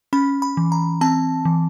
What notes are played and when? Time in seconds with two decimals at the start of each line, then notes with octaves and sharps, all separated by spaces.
0.13 C#4 B5
0.42 B5
0.57 E3
0.72 A#5
1.01 C4 A5
1.45 E3